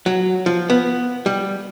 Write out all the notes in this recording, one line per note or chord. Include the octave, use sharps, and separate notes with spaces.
F#3
F3
B3
G3